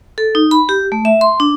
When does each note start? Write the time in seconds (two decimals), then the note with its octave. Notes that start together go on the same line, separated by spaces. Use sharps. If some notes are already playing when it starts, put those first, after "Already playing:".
0.18 A4
0.35 D#4
0.51 B5
0.69 G4
0.92 A3
1.05 E5
1.21 C6
1.40 D4